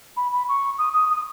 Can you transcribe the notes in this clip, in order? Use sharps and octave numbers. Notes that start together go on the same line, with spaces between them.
B5
B5
C#6
D#6
D#6
D#6